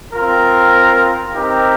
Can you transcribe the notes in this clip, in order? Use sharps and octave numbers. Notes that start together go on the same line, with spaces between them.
C4 F4 A#4
C4 D#4 G4 A#4